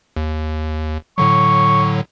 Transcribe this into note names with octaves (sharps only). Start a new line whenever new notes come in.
D#2
A2 D3 F#3 C#6